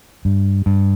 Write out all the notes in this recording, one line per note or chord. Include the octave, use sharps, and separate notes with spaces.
G2
G2